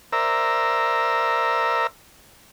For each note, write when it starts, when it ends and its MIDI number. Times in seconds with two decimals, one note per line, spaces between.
0.13 1.87 70
0.13 1.87 72
0.13 1.87 74
0.13 1.87 76
0.13 1.87 82
0.13 1.87 88